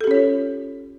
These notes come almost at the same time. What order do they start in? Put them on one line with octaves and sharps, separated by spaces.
A4 G4 C#4 C#5 F4